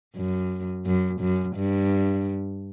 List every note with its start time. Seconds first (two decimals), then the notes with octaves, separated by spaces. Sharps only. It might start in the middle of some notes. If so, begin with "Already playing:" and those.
0.17 F#2
0.86 F#2
1.21 F#2
1.56 G2